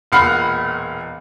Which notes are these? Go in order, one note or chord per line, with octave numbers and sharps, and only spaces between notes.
E1 A#2 F5 F#5 B5 F6